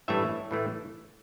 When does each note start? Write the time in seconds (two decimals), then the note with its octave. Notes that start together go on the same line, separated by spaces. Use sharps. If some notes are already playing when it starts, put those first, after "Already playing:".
0.08 A1 G2 E3 A3 D4 C#5 E5
0.51 A2 E3 A3